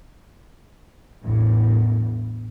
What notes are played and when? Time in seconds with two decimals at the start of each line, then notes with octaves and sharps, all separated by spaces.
1.22 A1 E2 G2